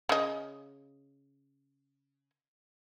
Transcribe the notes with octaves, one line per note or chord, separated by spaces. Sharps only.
C#3 D#5